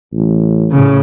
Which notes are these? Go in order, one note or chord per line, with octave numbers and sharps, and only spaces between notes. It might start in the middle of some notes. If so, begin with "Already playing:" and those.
A1
A2 C#3